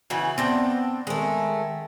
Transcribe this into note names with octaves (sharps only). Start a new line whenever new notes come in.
C#3 E3 F#4
B3 C4 D4 G5
D#3 G#3 A3